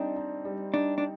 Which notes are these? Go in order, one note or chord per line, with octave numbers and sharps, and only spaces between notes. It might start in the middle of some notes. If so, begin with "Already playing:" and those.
Already playing: G3 C4 D4 D#4
D#4
G3
D4 D#4
D4